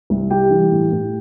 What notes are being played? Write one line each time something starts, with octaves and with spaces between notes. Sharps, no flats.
C2
G3 G4 G5
E3
A2
A2